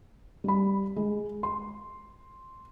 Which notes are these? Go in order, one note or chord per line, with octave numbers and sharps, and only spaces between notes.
G3 B5
G#3
C6